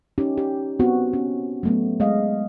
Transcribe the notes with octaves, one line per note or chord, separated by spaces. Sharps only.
C#4 D#4 G4
G4
B3 C4 F#4
C#4
F#3 A3 B3
G#3 D#5 F5